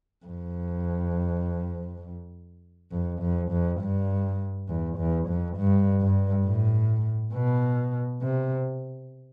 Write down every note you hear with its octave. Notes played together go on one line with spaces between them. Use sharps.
F2
F2
F2
F2
G2
E2
E2
F2
G2
G2
A2
B2
C3